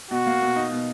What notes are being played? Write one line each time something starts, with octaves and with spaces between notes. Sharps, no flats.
B2 F#4
A#3
B2
D#4
B2